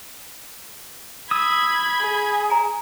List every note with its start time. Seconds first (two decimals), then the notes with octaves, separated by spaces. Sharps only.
1.31 B5 D#6 E6 G#6
1.99 G#4
2.50 G#5 A#5